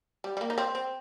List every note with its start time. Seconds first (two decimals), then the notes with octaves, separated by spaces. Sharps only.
0.24 G3
0.37 G3
0.41 A#3
0.50 D#4
0.58 C4
0.75 C4